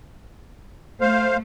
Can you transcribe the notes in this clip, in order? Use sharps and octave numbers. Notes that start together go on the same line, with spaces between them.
A3 C5 F5